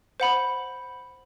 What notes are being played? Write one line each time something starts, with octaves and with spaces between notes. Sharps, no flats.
C5 F#5 B5